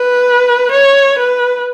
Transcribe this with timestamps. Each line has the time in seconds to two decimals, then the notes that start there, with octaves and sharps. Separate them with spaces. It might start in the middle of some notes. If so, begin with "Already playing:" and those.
Already playing: B4
0.72 C#5
1.18 B4